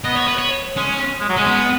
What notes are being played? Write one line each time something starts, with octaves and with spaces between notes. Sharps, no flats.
B3 D#5
C#5
B4
C#5
G#3 C#4
G#3
F#3
G#3 C#4
B3